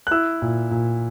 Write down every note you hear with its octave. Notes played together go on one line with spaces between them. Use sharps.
F#6
E4 E6
A#2
A#2